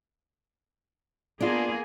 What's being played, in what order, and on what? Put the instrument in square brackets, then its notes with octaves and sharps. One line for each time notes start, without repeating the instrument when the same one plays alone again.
[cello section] A#3 B3 G#4 [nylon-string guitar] D4 F4